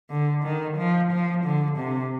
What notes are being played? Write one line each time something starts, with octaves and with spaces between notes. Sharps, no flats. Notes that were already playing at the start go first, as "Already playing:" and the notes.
D3
D#3
F3
F3
D3
C3